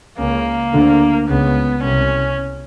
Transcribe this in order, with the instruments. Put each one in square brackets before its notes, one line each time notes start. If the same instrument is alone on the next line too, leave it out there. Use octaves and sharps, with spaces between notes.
[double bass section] C#2 C#3 [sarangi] A#3
[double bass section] D2 D3
[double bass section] C#2 C#3 [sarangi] B3
[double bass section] C2 C3 [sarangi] C#4